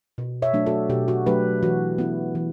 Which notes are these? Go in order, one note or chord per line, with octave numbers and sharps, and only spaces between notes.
B2
C#5 E5
F#3 A3 D4
F#4 A4
B2 G4
F#4
F#3 A3 D4 G4 B4
E3 F#4
B3 E4
E3